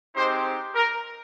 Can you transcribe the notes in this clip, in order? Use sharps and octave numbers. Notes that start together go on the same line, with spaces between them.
G#3 C4 D#4 G4 C5
A#4